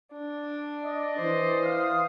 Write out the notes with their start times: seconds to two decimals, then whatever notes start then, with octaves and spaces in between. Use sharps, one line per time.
0.13 D4
0.85 D5 D#5
1.20 E3 C5
1.62 F5 D#6